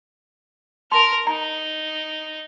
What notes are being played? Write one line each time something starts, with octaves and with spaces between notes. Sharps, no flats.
A#4 A5 C6 F6
D#4 A#5